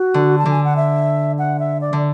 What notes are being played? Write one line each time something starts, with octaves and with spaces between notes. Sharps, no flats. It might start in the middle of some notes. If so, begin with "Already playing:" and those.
Already playing: F#4
D3
A5
D3
G#5
F#5
E5
F#5
E5
D5
D3